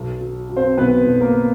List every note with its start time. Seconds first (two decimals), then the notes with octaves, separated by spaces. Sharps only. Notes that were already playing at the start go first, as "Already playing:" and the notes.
Already playing: B1
0.21 F#3
0.49 F#3
0.56 C4 C5
0.77 B1 B3 B4
1.06 B1
1.21 A#3 A#4